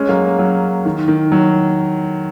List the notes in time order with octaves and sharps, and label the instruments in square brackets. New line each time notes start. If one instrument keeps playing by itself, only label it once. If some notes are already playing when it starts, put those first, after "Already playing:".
Already playing: [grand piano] G#3 C#4
F#3 A#3
F#3
D#3
D#3
F#3